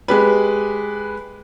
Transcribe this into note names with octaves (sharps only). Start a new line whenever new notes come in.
G#3 G4 B4